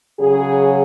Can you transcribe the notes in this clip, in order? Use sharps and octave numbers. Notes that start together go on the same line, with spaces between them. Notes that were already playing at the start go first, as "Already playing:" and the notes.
C#3 F#3 G#4